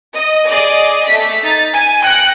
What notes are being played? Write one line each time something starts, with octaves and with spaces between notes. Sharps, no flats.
D#5
G#4 D5 D#5
A3 B6
D#4 A6
G#5
G5 F#6 A#6 C#7